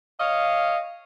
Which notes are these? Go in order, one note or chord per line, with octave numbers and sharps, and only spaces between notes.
C#5 D#5 F5